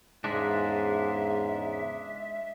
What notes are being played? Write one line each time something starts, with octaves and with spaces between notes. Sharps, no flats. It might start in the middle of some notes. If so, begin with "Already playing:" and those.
E2 G#2 C#3 G#3 D4 E5